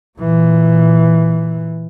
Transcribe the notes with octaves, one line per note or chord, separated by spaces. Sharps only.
A#2 E3